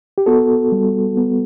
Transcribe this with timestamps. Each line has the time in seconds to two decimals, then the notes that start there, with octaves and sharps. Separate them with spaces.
0.18 G4
0.26 B3 F#4 A4
0.72 G3
1.17 B3